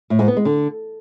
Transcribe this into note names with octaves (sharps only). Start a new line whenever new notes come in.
A2
G#2
B3
G#3
D3